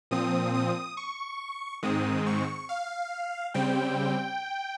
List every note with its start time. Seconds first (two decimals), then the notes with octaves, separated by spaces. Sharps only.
0.11 A#2 F3 C4 D#6
0.54 D#6
0.97 C#6
1.83 G#2 D#3 G#3 C4 D#6
2.26 C#6
2.69 F5
3.54 C#3 G3 C4 G5